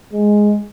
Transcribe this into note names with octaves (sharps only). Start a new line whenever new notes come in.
G#3